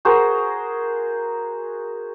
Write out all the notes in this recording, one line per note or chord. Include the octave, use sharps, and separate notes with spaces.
F#4 G#4 A#4 C5